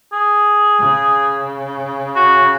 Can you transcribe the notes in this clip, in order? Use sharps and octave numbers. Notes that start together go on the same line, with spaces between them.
G#4
C#3
F#4